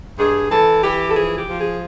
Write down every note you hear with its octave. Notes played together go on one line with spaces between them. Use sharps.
G2 G#4
E3 A4
E3 G4
A4
F3 G#4
G4
F3
G#4